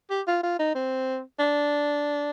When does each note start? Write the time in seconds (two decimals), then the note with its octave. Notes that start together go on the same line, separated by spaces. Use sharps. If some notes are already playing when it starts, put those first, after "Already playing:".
0.10 G4
0.28 F4
0.43 F4
0.59 D#4
0.75 C4
1.39 D4